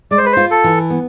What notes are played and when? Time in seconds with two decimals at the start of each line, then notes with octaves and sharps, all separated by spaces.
0.11 G#3 D5
0.18 C5
0.26 B4
0.33 F4 C5
0.51 A4
0.64 E3
0.90 B3